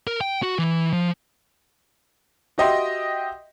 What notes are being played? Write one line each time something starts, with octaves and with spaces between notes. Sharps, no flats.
A#4
G5
F#4
E3
F3
F#4 G4 D#5 E5 G5 C6